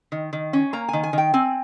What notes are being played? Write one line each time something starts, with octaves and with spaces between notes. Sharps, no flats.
D#3
D#3
C#4
A#3 A#5
D#3 G#5
G#5
D#3 G5
C4 G#5